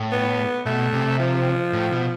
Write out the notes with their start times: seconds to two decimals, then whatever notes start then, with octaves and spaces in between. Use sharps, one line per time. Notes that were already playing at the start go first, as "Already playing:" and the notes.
Already playing: A2
0.12 B3
0.66 B2 A3
0.93 C3
1.19 F3
1.73 A2
1.92 B2